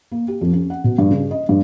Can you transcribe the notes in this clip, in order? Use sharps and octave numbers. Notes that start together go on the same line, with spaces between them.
A#3
G4
F2
C#4
F#5
B2
G2
C#3
D#5
G2